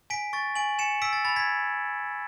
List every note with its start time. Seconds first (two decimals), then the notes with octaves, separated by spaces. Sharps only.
0.10 G#5 B6 D7
0.33 C#6 A6
0.55 G#5 D7 F#7
0.78 G#5 C#7 E7
1.02 E6 B6 D7
1.13 A6
1.25 B5 A6
1.36 G#6 B6